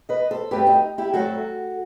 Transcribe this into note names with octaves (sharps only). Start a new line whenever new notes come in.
B4 D#5
A4 C5
G2 F#3 A3 C4 G4 B4
D#4
E4 G4
G2 F#3 A3 C4 F#4 A4